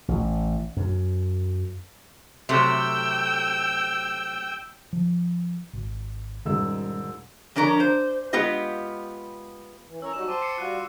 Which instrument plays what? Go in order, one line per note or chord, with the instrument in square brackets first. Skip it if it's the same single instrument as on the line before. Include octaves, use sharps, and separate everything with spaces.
[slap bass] A1
F#2
[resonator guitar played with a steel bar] C3 F#3 A3 [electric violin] G5 E6
[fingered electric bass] F3
G#1
[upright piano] E1 G#2 E6 [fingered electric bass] D#3 G3 C#4
[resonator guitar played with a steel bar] F2 C#4 D4 A#4 A#5
C5
G#3 B3 F4 G4 D#5
[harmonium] E3
[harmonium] C#4 A#4 C#5 [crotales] E6
[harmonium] F#3 G3 D#4 [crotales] C#6 E7
[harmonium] C5 G5 A5 [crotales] D6 D#7
[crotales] D6 C7 C#7
[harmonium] G3 F4 F#4 [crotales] F#6 D#7